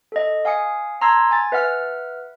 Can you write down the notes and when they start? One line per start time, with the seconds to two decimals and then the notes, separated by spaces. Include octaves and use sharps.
0.12 A4 D#5
0.45 F5 G#5 D#6 C#7
1.01 A5 A#5 C6 E6 G#6
1.31 G#5 A6
1.52 B4 E5 F#5 F6